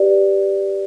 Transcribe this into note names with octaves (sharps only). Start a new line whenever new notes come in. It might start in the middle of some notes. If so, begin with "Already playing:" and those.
Already playing: G4 B4 D5